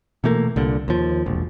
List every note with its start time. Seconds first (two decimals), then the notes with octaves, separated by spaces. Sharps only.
0.24 B2 E3 A3 A#3
0.56 C2 A#2 D3
0.88 D#2 F3
1.26 E1 A#1